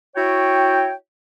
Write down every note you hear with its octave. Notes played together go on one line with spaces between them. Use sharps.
E4 F#4 C#5 G5